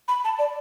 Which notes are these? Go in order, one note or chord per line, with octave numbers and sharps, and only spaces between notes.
B5
A5
D5